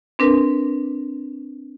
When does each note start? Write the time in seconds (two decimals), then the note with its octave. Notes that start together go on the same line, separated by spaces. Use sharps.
0.19 C4 D4 A#4 B4